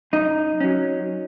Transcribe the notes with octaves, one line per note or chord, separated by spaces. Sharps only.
F#2 D#4
F#3 C#4